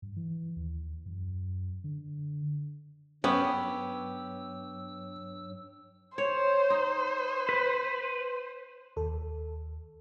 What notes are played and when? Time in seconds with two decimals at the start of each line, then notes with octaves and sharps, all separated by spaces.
0.02 G2
0.16 E3
0.56 D#2
1.06 F#2
1.84 D3
3.24 G2 F#3 B3 C#4 G4 E6
6.18 C5 C#5
6.70 D#4
7.49 B4
8.97 D#2 A4